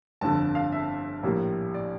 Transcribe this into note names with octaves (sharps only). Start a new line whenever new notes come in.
G1 F2 D3 A5
F5
E5
A#1 A2 G3 A#3
D5